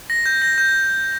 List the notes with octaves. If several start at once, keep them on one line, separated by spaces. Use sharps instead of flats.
A#6
G6
A#6
G6